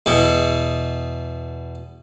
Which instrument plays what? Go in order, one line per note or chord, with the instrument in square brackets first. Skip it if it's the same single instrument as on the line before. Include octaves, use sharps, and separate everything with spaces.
[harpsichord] E2 B2